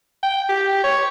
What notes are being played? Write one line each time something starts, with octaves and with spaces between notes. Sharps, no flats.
G5
G4
C#5